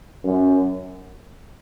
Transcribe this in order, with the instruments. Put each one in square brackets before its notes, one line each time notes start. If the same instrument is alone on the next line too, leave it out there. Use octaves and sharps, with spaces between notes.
[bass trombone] F#2